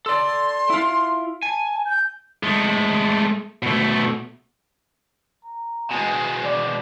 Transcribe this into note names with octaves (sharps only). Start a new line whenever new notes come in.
A4 D5 C6
E4 F4
G#5 A5
G6
G#3 A3
B2 A3
A#5
B2 G#3 G#5
D5